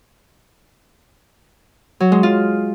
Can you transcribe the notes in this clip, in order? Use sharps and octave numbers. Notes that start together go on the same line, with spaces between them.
F#3
G#3
F4